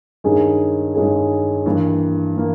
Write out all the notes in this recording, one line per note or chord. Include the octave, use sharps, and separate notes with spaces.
G2 D#3 G#3 C#4 G#4
G2 D#3 G#3 C#4 G#4
G2 E3 A#3
E3 A#3